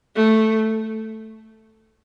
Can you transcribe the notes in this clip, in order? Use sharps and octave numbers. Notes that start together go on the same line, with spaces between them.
A3